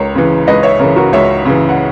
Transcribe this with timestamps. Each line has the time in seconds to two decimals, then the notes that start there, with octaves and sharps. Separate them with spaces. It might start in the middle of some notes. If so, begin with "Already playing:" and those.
Already playing: C#2 A#4 C#5
0.15 C#3 E3
0.47 C#2 B4 D#5
0.63 C#5 E5
0.79 C#3 E3 A#4 C#5
0.96 F#4 A#4
1.13 C#2 C#5 E5
1.45 C#3 E3
1.69 F#5